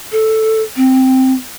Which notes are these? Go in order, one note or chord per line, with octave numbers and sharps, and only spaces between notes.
A4
C4